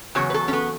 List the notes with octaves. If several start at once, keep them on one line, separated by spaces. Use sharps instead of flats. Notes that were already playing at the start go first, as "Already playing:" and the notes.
E2 C#3 F#3 C#5
B4
A4
C#4
B3